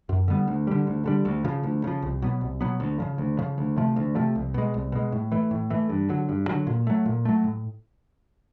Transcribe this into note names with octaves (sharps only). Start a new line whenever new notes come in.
F#2
D3 G3 B3
D2
D3 G3
D2
D3 G3
D2
C#3 F3
D2
C#3 F3
C2
B2 F#3 B3
C2
B2 F#3 B3
D2
C#3 F3
D2
C#3 F3
D2
C3 F3 A3
D2
C3 F3 A3
C2
B2 G#3
C2
B2 G#3
A2
E3 A3
A2
E3 A3
G2
D3 F#3
G2
D3 F#3
A#2
F#3 A3
A#2
F#3 A3
A2